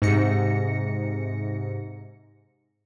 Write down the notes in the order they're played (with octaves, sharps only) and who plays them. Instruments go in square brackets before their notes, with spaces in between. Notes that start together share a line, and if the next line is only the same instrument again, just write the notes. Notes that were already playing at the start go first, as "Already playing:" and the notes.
[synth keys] G#2 C3 A#6 C#7